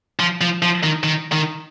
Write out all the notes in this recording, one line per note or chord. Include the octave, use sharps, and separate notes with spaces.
F3
F3
F3
D#3
D#3
D#3